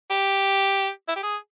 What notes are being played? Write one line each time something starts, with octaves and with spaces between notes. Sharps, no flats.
G4
E4
G4
G#4